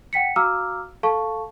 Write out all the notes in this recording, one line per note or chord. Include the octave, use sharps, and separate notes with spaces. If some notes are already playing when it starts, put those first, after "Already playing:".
F#5 G5 B6 C#7
F#4 F5 A#5 D6 E6 F6
A4 F5 A5 C#6